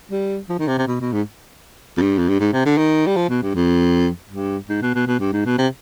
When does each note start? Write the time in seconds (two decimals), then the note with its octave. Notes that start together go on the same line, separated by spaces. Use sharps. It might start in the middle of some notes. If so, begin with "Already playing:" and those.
0.11 G3
0.49 F3
0.59 D#3
0.68 C3
0.78 C3
0.87 B2
1.01 B2
1.12 G#2
1.97 F2
2.02 G2
2.18 F2
2.29 G2
2.40 G#2
2.53 C3
2.66 D3
2.78 D#3
3.07 G3
3.16 F3
3.29 B2
3.42 G2
3.55 F2
4.31 G2
4.69 G#2
4.82 B2
4.95 B2
5.07 B2
5.20 G2
5.33 G#2
5.45 B2
5.58 C3